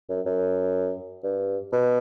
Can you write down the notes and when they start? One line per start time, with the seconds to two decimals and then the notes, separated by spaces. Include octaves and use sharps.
0.09 F#2
0.26 F#2
1.23 G2
1.72 B2